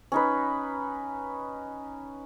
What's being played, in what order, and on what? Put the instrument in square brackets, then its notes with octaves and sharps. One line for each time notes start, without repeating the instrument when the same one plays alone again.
[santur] C#4 D#4 B4